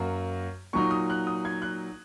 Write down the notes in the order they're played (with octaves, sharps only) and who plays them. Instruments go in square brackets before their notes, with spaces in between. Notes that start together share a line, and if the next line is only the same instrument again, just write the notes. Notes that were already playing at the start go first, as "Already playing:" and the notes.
Already playing: [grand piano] F#2 F#3 A#3
A#2 F#3 D#4 C#6
D#6
F#6
D#6
G#6
F#6